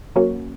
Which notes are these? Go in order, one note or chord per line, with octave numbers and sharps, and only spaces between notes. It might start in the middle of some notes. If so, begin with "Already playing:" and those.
F#3 A#3 C#4 F#4